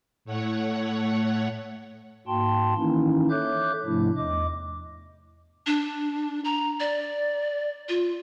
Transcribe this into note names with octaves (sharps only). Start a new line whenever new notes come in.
A2 A3 C#5 F#5
G#2 A#3 F#4 G5 A5 C6
D#3 E3 A#3 C#4 D#4 E4
A4 C#5 E5 D6 F#6 G6
G#2 C3 F3 A3 D4 E4
E2 D#5 D6
D4
A#5
D5
F4